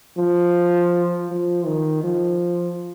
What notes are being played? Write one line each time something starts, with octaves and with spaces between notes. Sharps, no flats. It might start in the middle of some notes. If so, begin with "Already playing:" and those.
F3
F3
D#3
F3